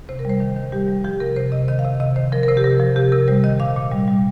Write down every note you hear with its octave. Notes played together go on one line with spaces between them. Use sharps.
C3 C5
A#4
G3 C5
D#3
D#3
G3 G4
G3
F3 G4
C3 A#4
C3 C5
C3 D#5
D#3 D#5
F5
C3
C3 D#5
D#3 C5
F3 A#4
A#4
C3 C5
G4
C3 A#4
F3
C3 G4
C3 A#4
G3 C5
D#3 D#5
A#2 F5
A#2
G3
G3